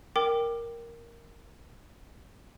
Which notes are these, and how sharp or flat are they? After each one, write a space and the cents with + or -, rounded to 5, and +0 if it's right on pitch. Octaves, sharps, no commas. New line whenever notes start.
A#4 +0 G5 +0 D6 +20